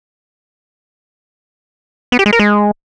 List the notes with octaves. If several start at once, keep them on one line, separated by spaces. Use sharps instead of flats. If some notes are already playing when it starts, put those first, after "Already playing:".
B3
G4
G#3
A#4
G#3